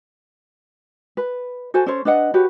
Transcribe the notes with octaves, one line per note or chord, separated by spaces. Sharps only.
B4
F#4 A4 C5 G#5
C#4 A4 C5 C#5
D4 B4 D#5 F#5
F#4 G4 B4 C#5